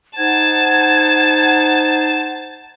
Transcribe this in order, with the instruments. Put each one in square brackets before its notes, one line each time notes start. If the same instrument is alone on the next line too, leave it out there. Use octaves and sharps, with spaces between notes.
[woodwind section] D#4 C5 F#5 [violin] A5 [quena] G#6